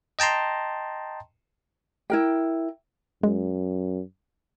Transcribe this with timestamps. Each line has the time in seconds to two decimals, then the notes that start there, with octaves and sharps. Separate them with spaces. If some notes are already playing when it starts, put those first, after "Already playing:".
0.19 D#5 G5 A5 A#5 C6
2.10 E4 A#4 G5
3.23 F#2 G#3